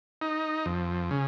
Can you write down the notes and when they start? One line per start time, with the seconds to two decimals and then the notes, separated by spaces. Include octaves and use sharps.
0.22 D#4
0.66 F2
1.11 C#3